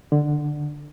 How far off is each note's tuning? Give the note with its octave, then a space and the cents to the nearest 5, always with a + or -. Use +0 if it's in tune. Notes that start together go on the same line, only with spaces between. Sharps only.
D3 +15